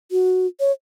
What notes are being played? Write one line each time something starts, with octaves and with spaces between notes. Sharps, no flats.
F#4
C#5